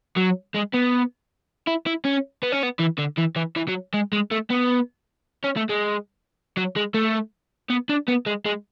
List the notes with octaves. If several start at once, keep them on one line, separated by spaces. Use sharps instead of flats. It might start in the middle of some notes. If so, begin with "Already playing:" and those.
F#3
G#3
B3
E4
E4
C#4
B3
C#4
B3
E3
D3
E3
E3
E3
F#3
G#3
G#3
A3
B3
C#4
A3
G#3
F#3
G#3
A3
B3
D4
B3
G#3
G#3